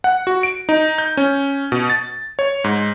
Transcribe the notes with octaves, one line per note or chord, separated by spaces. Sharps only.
F#5
F#4
D7
D#4
G6
C#4
B2
A6
C#5
G#2